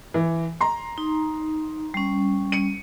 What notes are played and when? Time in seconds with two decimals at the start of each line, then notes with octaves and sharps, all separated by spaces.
0.14 E3
0.61 A#5 C6
0.98 D#4
1.94 G3 C#4
2.52 C#7 D#7